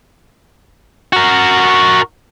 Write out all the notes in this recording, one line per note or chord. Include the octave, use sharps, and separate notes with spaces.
F#4 A#4